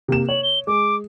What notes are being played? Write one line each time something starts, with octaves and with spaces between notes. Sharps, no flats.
C3 A#3 E7
C#5 F#7
G7
G#3 D6